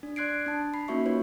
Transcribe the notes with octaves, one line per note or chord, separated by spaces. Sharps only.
D4
D5 C6 F#6 G#6 C7 D7
D4 A5
B5 C7
A#3 C#4 D#4 F#4 E5 C#6
D#4 F4 B4 C#5